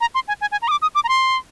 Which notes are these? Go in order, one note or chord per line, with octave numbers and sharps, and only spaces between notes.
A#5
C6
G#5
G#5
G#5
A#5
D#6
D6
D#6
D6
A#5
C6